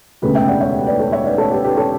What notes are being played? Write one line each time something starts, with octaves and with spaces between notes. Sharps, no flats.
E1 D2 C#3 G4 B4
E5 G5
D5 F#5
C#5 E5
B4 D5
A4 C#5
C#5 E5
B4 D5
A4 C#5
G4 B4
G4 B4
A4 C#5